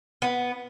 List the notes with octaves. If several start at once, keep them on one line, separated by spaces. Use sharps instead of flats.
B3